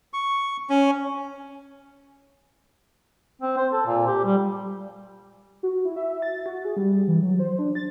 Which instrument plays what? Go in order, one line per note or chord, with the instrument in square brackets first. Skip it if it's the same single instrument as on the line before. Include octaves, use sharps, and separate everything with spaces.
[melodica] C#6
C#4
[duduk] C4
C5
A4
A#2
G4
G3
[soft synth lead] F#4
E4
E5
A6
F#4
G#4
G3
E3
F#3
C5
D4
A6